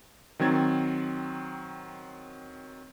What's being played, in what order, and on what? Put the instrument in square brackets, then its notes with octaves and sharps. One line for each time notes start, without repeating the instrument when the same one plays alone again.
[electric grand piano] D#3 F#3 C4 G#6 A6